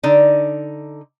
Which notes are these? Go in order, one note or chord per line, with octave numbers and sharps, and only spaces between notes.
D3 D#4 D5